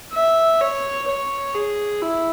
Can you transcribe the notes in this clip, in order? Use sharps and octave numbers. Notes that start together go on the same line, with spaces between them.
E5
C#5
C#5
G#4
E4